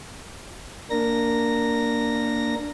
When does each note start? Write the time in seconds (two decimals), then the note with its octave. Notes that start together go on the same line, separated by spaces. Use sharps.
0.90 A#3 D4 A#4 A#6